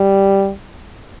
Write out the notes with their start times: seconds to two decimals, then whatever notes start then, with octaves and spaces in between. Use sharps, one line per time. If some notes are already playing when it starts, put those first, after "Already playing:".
Already playing: G3